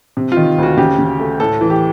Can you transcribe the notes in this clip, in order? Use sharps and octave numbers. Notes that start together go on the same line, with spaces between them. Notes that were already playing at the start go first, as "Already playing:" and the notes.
C3
D#3 F4
D2 F#4
C#3 G4
C#3
A3
A2 A4
E3
G4